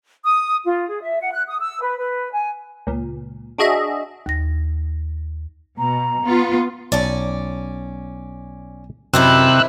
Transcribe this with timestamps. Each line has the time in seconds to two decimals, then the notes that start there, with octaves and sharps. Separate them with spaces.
0.24 D#6
0.65 F4
0.88 G#4
1.01 E5
1.21 F#5
1.33 F#6
1.47 D#6
1.60 E6
1.81 B4
1.98 B4
2.33 G#5
2.87 C#2 A#2
3.58 D4 F#4 G#4 D#5 E5
4.26 D#2 A#6
5.78 B2 A#5
6.24 B3 F4
6.92 B1 C#4 D5 A5
9.14 F#2 C3 D#3 C4 E4 G5 E6 F#6